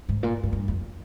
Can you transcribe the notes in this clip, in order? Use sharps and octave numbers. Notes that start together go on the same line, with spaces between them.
G#2
A#2
G#2
G2
F2